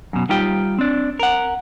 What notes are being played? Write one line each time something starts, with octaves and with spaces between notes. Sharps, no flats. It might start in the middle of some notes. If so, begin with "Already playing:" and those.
F#2 B2
G3 D#4 F4 G4 G5
C4 D4
A#4 F#5